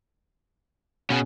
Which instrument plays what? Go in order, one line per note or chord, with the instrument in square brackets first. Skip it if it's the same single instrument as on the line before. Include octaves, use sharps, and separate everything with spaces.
[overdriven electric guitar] B2 [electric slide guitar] C#4 G#4